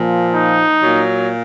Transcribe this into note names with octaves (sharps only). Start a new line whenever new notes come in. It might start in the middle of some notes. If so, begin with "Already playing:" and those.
Already playing: A#2 F3
D#4
A#2 F#3